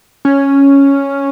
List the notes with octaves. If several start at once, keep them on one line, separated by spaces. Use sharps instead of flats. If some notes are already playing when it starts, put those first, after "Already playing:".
C#4